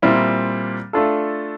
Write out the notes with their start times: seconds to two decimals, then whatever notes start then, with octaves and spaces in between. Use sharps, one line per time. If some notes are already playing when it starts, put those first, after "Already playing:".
0.02 A#2 G3 C4 E4
0.93 A3 D4 F4 A4